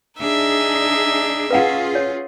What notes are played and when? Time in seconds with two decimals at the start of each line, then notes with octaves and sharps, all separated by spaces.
0.20 D4 D#4 G#4 E5
1.51 C#4 F4 G#4 B4 F5 F#5
1.95 C#5